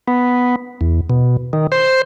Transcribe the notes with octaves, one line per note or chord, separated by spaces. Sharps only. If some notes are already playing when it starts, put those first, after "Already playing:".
B3
E2
B2
D#3
C5